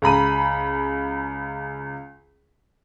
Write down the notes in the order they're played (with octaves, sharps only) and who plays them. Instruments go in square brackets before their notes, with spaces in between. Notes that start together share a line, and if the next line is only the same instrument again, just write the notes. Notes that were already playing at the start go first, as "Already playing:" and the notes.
[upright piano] C#2 A#5 B5 D#7